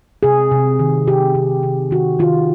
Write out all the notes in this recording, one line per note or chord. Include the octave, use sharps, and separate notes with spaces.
C3 G#4
C3
D#3
C3 G4
C3
C3
D#3 F#4
D#3 F4